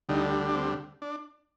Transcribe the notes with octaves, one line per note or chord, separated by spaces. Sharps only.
D2 D3 G3 D#4
D4
C4
D4